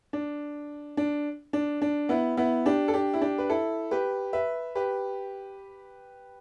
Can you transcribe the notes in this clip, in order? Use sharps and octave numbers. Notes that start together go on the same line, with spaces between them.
D4
D4
D4
D4
B3 E4
B3 E4
D4 G4
A4
D4 G4
E4
D4 G4
B4
E4 A4
G4 B4
B4 E5
G4 B4